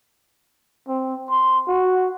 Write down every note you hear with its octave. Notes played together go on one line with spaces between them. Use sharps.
C4
C6
F#4